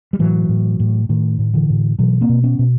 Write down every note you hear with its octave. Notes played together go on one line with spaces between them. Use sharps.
G3
A2 E3 F#3
A2
A2
A2 D#3
A2
D3 E3
A2
B2 E3 F#3
A#3 C4
B2
B3 C#4
B2